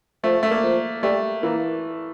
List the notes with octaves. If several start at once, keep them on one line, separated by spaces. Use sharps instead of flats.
F3 A3
A3
A#3
F3
G3 A3
E3 A#3